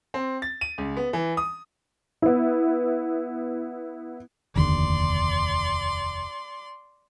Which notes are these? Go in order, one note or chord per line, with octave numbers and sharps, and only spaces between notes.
C4
A6
D#7
C#2
B3
E3
D#6
B3 E4
F1 D#2 D3 D5 C6